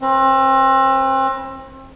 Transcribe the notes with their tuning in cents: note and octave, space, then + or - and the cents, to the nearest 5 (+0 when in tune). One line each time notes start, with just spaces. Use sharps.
C4 +35 B4 +0